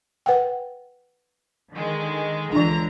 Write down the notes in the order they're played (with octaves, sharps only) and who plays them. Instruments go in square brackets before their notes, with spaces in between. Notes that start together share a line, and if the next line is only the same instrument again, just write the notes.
[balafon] B4 F#5 G5
[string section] D3 D#3 G#3
[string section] C#2 D3 A#5 [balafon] E3 D4